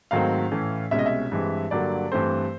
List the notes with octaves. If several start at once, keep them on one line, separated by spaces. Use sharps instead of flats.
G#2 D#3 F#3 A3 C4 F5
A2 E3 A3 C#4
C2 B2 G#3 C#4 E5
D#5
E5
G2 E3 G#3 C4
G2 D3 F#3 A#3 D5
G2 E3 A3 C4 C5